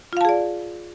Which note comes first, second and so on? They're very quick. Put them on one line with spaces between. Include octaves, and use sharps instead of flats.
F4 F5 A5 G#4 D5